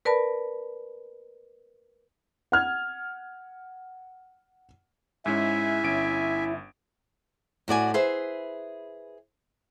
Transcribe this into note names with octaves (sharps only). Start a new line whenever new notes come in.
A#4 B4 D5 A5 B5
F#5 F6 G#6
G#2 G#3 C#4 E4 E5 G#5
G1 C#4 D7
A2 F#4 D5 G#5
G#4 B4 C5 E5